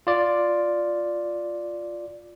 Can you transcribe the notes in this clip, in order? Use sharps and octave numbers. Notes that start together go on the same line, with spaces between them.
F4 D5